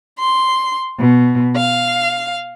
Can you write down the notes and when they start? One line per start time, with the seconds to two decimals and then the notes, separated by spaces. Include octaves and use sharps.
0.19 C6
0.98 B2
1.56 F5